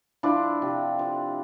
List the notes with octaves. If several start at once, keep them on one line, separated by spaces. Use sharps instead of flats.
F3 D4 E4
C3
F3